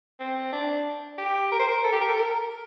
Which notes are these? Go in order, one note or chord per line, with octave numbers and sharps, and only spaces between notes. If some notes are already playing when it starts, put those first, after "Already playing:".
C4
D4
G4
A#4
C5
A#4
A4
G4
A#4
A4
A#4
A#4